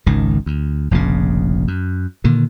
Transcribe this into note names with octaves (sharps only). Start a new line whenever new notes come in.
G#1 C#2 D#3
D2
F1 A#1 F2 C#3
F#2
A#2 D3 D#3